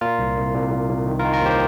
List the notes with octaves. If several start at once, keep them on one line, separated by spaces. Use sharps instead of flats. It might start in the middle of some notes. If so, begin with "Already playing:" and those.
A#2 F4 A#4
C2
C2
C2
C2
C2
D#3
D#3 F4 A#4
F4 A#4
D#2 G4 C5